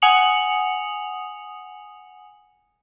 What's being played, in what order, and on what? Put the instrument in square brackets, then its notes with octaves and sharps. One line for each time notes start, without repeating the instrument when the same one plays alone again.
[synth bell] F#5 G#5 D#6 C#7 F7 F#7